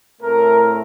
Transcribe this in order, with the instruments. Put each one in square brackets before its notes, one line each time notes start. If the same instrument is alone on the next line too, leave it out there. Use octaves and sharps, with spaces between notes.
[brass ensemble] A2 A3 C4 A#4